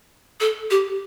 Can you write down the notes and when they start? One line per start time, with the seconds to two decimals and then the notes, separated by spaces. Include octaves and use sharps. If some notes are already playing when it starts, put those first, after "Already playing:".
0.40 A4
0.70 G4